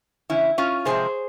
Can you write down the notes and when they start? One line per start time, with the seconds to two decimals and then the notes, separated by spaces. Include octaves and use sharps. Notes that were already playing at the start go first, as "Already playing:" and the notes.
0.30 C#3 E3 C#4 E4
0.58 C#4 F4
0.85 C3 F3 G#3 C4 G#4 C5